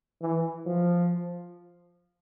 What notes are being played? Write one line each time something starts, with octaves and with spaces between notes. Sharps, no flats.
E3
F3